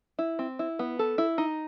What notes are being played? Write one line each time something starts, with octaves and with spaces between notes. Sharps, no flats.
E4
C4
E4
B3
A4
E4
D#4